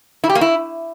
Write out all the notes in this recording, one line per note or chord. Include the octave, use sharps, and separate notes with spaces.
E4
G4
A#3
E4